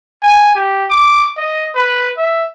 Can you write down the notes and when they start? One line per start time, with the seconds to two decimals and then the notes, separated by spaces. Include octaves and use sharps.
0.23 G#5
0.55 G4
0.90 D6
1.37 D#5
1.75 B4
2.17 E5